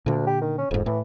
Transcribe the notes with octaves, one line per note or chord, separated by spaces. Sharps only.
D2 A#2 D3
G4
D#3
C#4
E1 F2 G#2
A2 E3